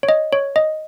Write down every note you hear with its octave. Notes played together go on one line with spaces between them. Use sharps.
C#5
D#5
C#5
D#5